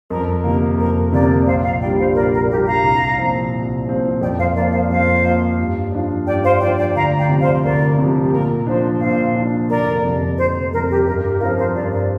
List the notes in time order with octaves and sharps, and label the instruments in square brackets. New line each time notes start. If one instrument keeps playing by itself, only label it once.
[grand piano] F2 [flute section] A#4
[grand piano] C3 A#3 [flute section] A#4
[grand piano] F2 [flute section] A#4
[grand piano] C3 A#3 [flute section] A#4 D5
[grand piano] A#1 [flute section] C5 F5
[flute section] F5 A#5
[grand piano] A#2 [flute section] D5 G5
[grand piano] G3 D4
[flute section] C5 F5
[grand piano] A#1 [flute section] A#4 D5
[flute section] A#4
[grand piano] A#2 G3 D4 [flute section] G4
[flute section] F5 A#5
[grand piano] C2
A#2 F3 C4
C2
A#2 F3 C4
[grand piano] F2 [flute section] D5 G5
[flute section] C5 F5
[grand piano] F3 A#3 F4 [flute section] A#4 D5
[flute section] C5 F5
[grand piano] F2 [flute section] C5 F5
[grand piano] F3 A#3 F4
G2
F3 D4 F4
[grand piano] G2 [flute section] D5 G5
[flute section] C5 F5
[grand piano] F3 D4 F4 [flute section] D5 G5
[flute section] D5 G5
[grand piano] D2 [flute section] F5 A#5
[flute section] D5 G5
[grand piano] C3 F3
[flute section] C5 F5
[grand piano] D2 [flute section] A#4 D5
[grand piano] C3 F3
[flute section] G4
[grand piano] A#2 [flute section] A#4
[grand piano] F3 D4 [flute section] C5
[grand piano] A#2 [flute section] C5 F5
[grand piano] F3 D4
[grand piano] F1 [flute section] A#4 D5
[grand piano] F2 C3
[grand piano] F1 [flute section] C5
[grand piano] F2 C3 [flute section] A#4
[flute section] G4
[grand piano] G2 [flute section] A#4
[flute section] G4
[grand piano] F3 C4 F4 [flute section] A#4
[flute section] C5
[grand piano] G2 [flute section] A#4 D5
[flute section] A#4 D5